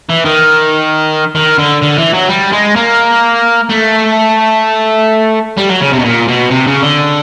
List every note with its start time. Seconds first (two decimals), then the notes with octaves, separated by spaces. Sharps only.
0.10 E3
0.25 D#3
1.35 D#3
1.58 D3
1.82 D3
1.97 E3
2.13 F#3
2.29 G3
2.52 G#3
2.75 A#3
3.69 A3
5.57 G3
5.69 F#3
5.81 C#3
5.93 C3
5.99 B2
6.04 A#2
6.28 B2
6.51 C3
6.67 C#3
6.82 D3